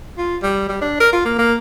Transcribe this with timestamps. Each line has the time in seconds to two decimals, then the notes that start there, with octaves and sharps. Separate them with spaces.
0.18 F4
0.43 G3
0.69 G3
0.82 D4
1.00 A#4
1.13 F4
1.25 A#3
1.39 A#3